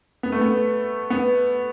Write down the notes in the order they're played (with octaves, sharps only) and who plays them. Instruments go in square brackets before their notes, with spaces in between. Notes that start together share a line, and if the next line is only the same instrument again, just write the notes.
[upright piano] B3
A3
B3
B3